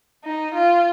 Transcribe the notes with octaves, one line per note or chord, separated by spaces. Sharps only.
D#4
F4